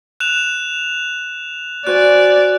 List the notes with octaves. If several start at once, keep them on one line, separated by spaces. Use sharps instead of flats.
F#6 E7 F7
F#4 C5 D5 G#5 F#6